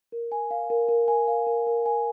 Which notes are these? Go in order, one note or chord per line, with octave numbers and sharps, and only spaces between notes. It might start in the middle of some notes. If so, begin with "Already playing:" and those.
A#4
G#5
F5
A#4
A#4
G#5
F5
A#4
A#4
G#5